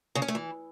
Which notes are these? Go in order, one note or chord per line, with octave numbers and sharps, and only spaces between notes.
C#3
C#4
A3
E3